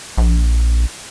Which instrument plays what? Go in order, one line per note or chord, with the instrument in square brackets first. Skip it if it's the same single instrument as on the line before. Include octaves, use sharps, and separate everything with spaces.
[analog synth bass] A#1